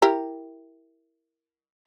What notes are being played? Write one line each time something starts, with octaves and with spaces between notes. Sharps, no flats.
E4 G4 A#4